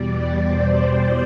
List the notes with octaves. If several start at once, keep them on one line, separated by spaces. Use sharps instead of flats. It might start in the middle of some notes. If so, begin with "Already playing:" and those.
Already playing: E2 B2 G3 D5
C5